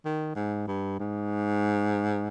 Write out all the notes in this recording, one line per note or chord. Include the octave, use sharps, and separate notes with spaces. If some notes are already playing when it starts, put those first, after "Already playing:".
D#3
G#2
G2
G#2